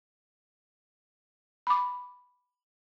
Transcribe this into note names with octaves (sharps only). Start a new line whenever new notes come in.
B5 D6